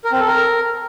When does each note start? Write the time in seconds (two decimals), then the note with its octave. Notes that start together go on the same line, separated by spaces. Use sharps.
0.04 A#4
0.12 C4
0.20 A4
0.27 A#4